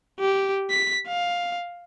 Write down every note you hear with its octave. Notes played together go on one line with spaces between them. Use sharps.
G4
B6
F5